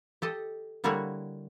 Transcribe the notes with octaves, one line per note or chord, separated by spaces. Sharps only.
G4 A4 D#5
D3 G3 A#3 E4 F#4 C#5